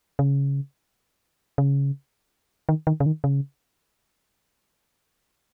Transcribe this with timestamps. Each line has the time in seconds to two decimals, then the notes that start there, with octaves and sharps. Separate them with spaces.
0.19 C#3
1.58 C#3
2.69 D#3
2.87 D#3
3.00 C#3
3.06 D#3
3.24 C#3